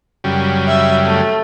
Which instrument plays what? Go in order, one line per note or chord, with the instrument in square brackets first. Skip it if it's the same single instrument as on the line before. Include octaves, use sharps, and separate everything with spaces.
[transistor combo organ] F#2 C#3 G3
[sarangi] E5
A3